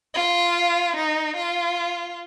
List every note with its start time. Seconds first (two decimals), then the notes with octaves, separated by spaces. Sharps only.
0.14 F4
0.97 D#4
1.37 F4